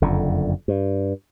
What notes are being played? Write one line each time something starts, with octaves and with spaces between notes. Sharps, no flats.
F#1 F2 D3
G2